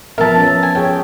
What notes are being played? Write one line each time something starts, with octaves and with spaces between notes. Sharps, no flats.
F3 B3 A#4 E5 A5
C#4
G#5
G#4 C#5 G5